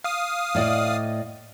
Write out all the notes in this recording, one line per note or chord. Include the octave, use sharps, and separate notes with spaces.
F5 D#6
A2 D5 D#5